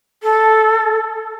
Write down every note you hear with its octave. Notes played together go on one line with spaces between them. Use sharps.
A4